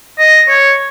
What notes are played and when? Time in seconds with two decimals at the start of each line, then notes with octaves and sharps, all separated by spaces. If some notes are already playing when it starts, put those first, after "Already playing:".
0.19 D#5
0.49 C#5